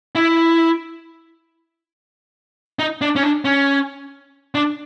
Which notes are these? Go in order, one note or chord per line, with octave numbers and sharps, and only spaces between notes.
E4
D#4
D4
C#4
D4
C#4
D4